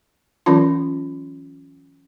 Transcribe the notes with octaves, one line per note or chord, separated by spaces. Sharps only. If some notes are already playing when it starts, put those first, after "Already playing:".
E3 F#3 C#4 F4